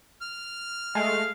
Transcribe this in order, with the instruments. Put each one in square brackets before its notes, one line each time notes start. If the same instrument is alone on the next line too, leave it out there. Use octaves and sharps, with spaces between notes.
[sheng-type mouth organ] F6
[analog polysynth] G#3 A3 [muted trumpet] F5